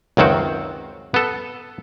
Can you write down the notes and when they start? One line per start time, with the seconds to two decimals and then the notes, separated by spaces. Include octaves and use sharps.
0.17 C#2 F#2 D#3 C4 F#4
1.14 B3 A4